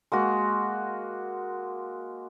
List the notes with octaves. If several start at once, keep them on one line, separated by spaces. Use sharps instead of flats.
G#3 A#3 F#4